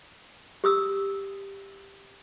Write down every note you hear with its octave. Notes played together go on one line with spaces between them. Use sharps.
G4 D#6 E6